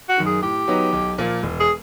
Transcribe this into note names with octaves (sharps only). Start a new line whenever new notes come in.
F#4
F#2 D#3
G#4
A2 G4
F#3 B3 D#4
B1
A#2 F3 A#3
E1
G#4